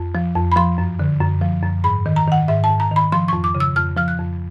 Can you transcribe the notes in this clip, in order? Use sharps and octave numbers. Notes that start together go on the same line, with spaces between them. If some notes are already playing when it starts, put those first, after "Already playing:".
Already playing: F2
F3
F2
B5
F3 C6
F#2
D3
F#2
F3
F#2
G#2 B5
D#3
A#5
D#3 F#5
G#2 E5
A5
G#2
A#5
D#3
B5
F3 C6
F2 C#6
D6
C#3
E6
F2 F6
F3 F6
F#6
F2